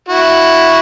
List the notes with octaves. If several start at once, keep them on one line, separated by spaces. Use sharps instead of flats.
E4 F#4